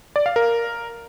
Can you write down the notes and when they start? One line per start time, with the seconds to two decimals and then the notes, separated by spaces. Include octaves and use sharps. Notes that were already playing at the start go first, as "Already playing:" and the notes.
0.16 D5
0.26 F5
0.36 A#4